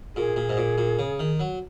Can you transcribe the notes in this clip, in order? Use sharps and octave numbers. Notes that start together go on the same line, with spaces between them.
A#2 G#4
A#2
G#2
A#2
A#2
C#3
D#3
F#3